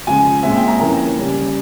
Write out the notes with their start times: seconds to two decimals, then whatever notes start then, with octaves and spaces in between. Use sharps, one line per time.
0.07 C#3 F3 G#3 G#5
0.43 A#2 G#3 C4 E5
0.56 G5
0.68 A#5
0.80 F2 E3 A#3 C#4 A#5
1.17 C#3 G3 C#4